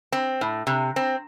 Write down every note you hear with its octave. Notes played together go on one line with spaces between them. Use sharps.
C4
A2
C3
C4